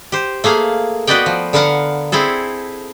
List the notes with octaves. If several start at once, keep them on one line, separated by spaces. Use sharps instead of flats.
G4 C5
A3 A#3 G#4 F5
B3 F#4 B4 D5 D#5 G5
F3
D3 B3 A#4 F5 F#5
C4 E4 G#4 A4